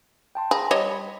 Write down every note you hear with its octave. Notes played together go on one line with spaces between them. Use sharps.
G5 A5 C6
G#4 A#5 B5 A#6
G3 C#5 D#5
B5